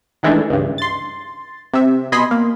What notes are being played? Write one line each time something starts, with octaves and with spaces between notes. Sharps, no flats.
D#3 E3 G#3 A3 D4
C#2 G2
C6 A6
C3 E5
B2 D#5 G#5 B5 C6 B6
A#3